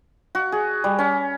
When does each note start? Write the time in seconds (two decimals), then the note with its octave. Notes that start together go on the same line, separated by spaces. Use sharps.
0.35 F#4
0.52 G#4
0.84 G3
0.99 C#4